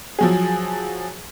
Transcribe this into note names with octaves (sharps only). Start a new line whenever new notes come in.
F3 F#3 G#4